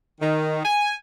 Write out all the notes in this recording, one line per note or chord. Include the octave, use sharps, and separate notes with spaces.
D#3
G#5